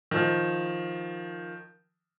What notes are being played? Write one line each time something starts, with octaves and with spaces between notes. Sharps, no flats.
D#3 F3